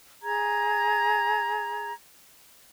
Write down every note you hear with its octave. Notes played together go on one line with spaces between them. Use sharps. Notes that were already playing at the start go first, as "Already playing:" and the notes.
G#4 A#5 G#6